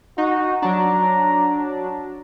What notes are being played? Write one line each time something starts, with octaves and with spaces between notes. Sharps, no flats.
D#4 F#4
F#3 D4 A#5